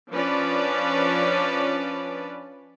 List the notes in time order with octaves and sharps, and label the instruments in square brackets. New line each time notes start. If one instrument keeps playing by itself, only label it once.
[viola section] F3 C#4 D4 B4 D5